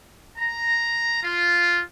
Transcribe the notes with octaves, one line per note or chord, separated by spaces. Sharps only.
A#5
F4